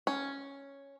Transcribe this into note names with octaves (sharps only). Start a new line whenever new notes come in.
C#4